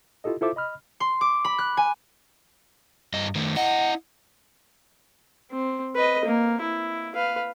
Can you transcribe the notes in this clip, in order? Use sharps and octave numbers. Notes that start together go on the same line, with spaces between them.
E4 F4 G4 A4 D#5
E4 F4 A4 C5 E5 D6
D#5 B5 F6
C6
D6
B5
F#6
G#5
G2 D#5
D#3 A3
E4 D#5 F#5
C4
B4 D#5
A#3
E4
B4 F5